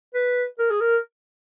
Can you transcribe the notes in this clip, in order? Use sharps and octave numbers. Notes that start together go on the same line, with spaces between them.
B4
A#4
G#4
A#4